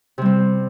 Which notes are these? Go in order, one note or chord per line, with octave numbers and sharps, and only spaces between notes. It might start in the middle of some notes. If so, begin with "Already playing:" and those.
C3 G3 C4